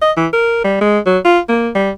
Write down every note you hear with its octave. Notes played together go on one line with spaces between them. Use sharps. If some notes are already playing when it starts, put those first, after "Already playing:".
D#5
E3
A#4
G3
G#3
F#3
F4
A#3
G3